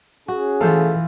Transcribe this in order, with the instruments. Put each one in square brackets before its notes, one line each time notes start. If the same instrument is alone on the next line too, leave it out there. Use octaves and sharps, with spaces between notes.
[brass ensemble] C#4 G#4 [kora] F#4
[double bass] E3 [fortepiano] A3 A4 [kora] F4 C5 F5